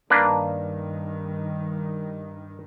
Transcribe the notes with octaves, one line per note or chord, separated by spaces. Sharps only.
G2 D#3 A#3 D4 B4